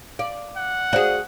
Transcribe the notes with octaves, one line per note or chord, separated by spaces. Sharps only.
D5 F5
F#5
F#4 G#4 C5 D5 F5